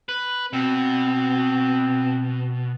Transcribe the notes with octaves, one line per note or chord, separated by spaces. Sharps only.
B4
B2 C4